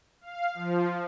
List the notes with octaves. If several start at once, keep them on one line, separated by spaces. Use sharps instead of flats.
F5
F3